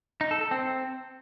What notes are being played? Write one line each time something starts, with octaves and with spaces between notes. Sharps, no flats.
D#4
A4
A4
C4